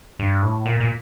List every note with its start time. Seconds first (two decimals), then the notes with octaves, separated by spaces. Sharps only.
0.19 G2
0.43 A2
0.66 A#2
0.80 A#2